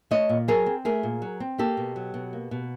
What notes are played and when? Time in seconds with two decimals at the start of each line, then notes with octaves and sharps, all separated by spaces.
0.11 A3 C#5 D#5
0.29 A#2
0.48 F#3 G#4 A#4
0.66 C4
0.85 A3 G#4 A#4
1.03 A#2
1.22 F#3
1.40 C4
1.58 A#3 G4 A4
1.77 B2
1.96 F#3
2.14 B2
2.33 A#3
2.51 B2